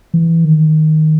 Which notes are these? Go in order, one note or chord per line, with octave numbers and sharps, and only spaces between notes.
E3
D#3